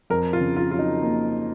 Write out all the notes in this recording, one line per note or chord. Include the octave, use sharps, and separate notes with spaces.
F2 A#4
F4
C#3
F4
F#3 F4
D#4
A#3